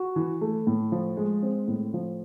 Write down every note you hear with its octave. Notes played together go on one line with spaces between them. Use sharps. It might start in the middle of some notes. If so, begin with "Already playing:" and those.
Already playing: F#4
E3
A3
A2
F3
G#3
C4
A2
F3